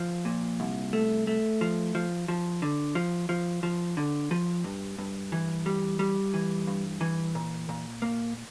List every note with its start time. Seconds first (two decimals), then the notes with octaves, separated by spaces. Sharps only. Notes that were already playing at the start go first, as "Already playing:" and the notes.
Already playing: F3
0.25 A#2
0.60 C2
0.93 A3
1.27 A3
1.61 F3
1.95 F3
2.28 F3
2.62 D3
2.95 F3
3.29 F3
3.63 F3
3.97 D3
4.31 F3
4.64 G2
4.98 G2
5.32 E3
5.66 G3
5.99 G3
6.34 E3
6.67 G2
7.01 E3
7.35 A#2
7.69 A#2
8.02 A#3